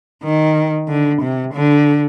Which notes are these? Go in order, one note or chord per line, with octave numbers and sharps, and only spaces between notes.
D#3
D3
C3
D3